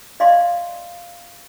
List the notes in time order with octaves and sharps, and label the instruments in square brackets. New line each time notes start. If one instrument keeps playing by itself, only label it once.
[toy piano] D5 D#5 F5 C6